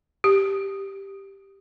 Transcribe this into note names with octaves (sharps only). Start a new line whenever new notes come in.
G4